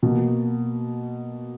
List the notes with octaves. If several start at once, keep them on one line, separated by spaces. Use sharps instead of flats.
B2 A#3